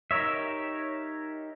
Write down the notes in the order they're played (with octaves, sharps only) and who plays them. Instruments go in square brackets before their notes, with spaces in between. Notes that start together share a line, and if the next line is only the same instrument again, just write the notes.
[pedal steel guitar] D#4 G4 A#4 C#5 E5